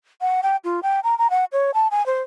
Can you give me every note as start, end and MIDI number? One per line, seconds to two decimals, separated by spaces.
0.21 0.41 78
0.43 0.56 79
0.64 0.80 65
0.83 1.00 79
1.04 1.17 82
1.19 1.30 82
1.30 1.45 78
1.52 1.71 73
1.74 1.88 81
1.91 2.05 80
2.06 2.22 72